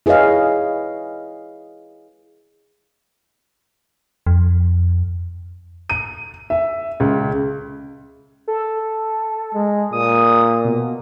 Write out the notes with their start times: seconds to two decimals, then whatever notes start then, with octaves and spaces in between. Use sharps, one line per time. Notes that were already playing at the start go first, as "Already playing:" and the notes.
0.06 E4 G#4 B4 C#5 D#5 F5
4.27 F2
5.90 D#7
6.50 E5
7.00 C#2
8.48 A4
9.54 G#3
9.92 A#2 D#6
10.65 B2